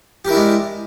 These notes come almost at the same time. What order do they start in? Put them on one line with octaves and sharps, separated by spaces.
G4 A#4 E4 D4 G#3